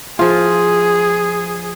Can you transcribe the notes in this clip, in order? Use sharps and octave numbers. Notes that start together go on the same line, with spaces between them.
F3 F4 G#4